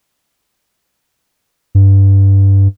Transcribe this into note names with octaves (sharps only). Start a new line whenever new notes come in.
G2